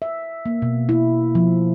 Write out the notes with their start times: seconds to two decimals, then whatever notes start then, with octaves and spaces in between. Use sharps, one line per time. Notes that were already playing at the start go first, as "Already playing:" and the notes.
0.02 E5
0.46 A#3
0.62 B2
0.89 E4
1.35 F3